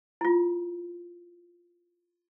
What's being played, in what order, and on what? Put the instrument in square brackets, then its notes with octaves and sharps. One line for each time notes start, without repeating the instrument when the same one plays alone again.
[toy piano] E4 F4